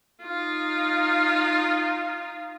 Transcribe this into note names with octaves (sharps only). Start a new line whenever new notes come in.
D#4 F4